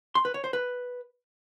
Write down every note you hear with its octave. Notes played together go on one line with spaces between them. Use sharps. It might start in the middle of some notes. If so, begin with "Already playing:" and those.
C6
B4
C#5
C5
B4